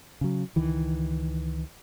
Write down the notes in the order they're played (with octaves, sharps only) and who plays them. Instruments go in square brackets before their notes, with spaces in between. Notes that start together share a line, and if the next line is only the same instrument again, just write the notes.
[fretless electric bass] C#3 F#3
C#2 D#3 E3